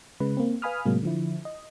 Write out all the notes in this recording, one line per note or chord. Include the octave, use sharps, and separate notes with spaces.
C#3 G#3 B4
A#3 C4
B4 F5 G#5 B5 D#6 F6
A2 C3 F#3 G#3 A#3
D3 F3 E4
D#5